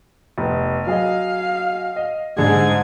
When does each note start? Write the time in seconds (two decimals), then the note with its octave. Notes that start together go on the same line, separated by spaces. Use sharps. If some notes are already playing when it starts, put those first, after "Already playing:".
0.38 F1 B3
0.87 F#3 G#4 D#5 F5
1.96 D#5
2.38 C2 G#2 D3 G#4 G#6